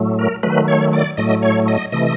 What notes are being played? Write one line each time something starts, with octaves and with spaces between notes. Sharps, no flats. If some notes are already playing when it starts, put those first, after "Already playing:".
Already playing: A2 F#3 A3
A#4
D#3 F#3 A3 B4
C#5
D5
A2 F#3 A3 D#5
C#5
D#5
C3 E3 A3 D#5